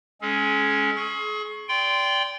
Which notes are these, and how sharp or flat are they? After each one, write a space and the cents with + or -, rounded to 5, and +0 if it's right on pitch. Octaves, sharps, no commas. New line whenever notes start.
G#3 +0 C#4 +0 G#4 +45
G#4 +35 C#6 -10
D5 -25 G5 +0 C6 -15